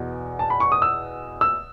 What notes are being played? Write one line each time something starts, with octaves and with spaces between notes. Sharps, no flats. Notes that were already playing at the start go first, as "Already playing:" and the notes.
Already playing: E2 B2
A5
B5
C#6
D#6
E6
E6